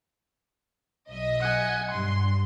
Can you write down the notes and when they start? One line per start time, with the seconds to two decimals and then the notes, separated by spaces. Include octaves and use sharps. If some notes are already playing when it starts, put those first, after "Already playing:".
1.10 B1 D#5 E5
1.40 F#5 G#5
1.91 G2 C6